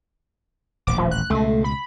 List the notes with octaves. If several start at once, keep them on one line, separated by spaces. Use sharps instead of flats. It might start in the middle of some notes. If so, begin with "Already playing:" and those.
D#1 A1 D6
F3
F#6
C#2 B2 A3
B5